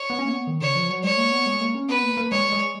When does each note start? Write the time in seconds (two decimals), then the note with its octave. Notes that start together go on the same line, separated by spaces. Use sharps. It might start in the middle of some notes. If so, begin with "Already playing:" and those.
Already playing: C#5
0.10 B3
0.19 C#4
0.25 A#3
0.32 B3
0.47 D#3
0.61 C#3 C#5
0.75 F3
0.90 F#3
1.03 G#3 C#5
1.17 A#3
1.32 B3
1.46 G#3
1.61 A#3
1.74 C#4
1.88 B3 B4
2.03 A#3
2.17 A#3
2.31 G#3 C#5
2.52 G#3